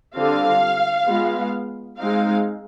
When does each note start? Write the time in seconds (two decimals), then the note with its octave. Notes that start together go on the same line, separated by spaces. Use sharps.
0.16 D3 G3 C4 F4 F5
1.07 G#3 B3 F4
1.98 G#3 C4 D#4 F5